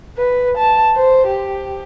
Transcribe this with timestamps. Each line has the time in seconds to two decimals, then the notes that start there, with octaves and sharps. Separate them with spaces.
0.18 B4
0.58 A5
0.96 C5
1.27 G4